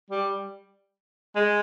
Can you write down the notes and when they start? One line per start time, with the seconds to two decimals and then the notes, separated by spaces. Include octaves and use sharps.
0.11 G3
1.36 G#3